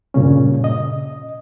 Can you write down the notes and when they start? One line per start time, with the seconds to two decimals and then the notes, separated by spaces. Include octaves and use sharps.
0.14 G2 A#2 C#3 C#4
0.64 D#5